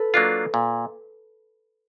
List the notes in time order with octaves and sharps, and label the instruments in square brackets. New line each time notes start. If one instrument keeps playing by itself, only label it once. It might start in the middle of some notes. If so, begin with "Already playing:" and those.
Already playing: [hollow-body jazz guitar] A4 B4
[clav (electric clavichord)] F#3 A#3 D4 F4
A#2